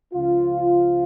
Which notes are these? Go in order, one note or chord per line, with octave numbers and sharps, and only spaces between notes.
C#2 C#3 F3 F4